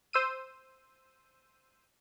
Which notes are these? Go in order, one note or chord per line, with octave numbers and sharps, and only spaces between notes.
C5 E6 D#7